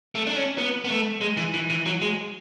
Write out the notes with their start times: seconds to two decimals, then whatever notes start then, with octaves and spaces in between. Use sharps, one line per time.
0.15 A3
0.27 D4
0.36 C#4
0.58 B3
0.85 B3
0.90 A3
1.21 G#3
1.37 E3
1.54 E3
1.70 E3
1.86 F#3
2.02 G#3